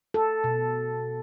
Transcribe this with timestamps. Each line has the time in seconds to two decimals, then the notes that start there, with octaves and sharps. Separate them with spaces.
0.14 A4
0.44 B2